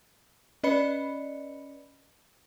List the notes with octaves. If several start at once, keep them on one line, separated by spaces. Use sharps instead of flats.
C#4 B4 D5 D#5 B5 C#7